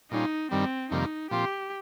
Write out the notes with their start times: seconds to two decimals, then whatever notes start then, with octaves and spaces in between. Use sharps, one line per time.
0.11 A#2 G3 C#4 D#4 F4
0.51 G2 D#3 G3 C4
0.91 F2 C3 D#3 G3 A#3 D#4
1.31 A#2 F3 C4 F4 G4